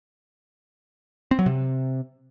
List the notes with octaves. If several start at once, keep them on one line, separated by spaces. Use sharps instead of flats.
C4
F#3
C3